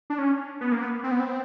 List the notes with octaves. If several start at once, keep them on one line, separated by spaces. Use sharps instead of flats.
D4
C#4
B3
A#3
B3
C4
B3
C4